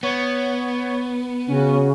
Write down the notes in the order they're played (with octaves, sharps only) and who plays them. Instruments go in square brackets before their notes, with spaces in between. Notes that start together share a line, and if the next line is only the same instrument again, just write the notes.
[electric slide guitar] B3 [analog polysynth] C#5
[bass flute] C#3 [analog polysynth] C#4 F#4